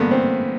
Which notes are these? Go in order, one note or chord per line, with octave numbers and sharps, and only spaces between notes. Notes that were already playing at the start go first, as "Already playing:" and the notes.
Already playing: A1 G2 D3 A#3 B3
C4